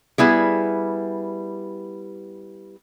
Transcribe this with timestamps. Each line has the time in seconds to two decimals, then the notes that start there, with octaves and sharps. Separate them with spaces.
0.18 G3 B3 E4 G#4